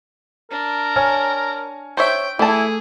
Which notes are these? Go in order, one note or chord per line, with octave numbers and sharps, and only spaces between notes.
D4 A#4
C#5 G#5 F6
C5 C#5 E5 G5
E3 A3 E4 G#4 A5